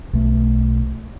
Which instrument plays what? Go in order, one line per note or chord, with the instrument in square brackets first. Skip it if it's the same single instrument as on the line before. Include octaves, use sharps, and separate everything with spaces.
[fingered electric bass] B1 A3